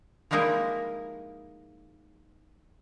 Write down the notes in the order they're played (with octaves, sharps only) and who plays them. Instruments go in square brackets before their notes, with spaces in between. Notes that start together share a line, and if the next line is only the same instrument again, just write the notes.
[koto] F3 G3 G#3 A#3 D#4 E4